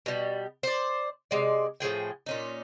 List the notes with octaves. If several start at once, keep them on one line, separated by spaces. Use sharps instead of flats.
B2 G3
C5 D5
C3 G#3 D5
A2 F3 G#4 G5
A#2 C#4 D#4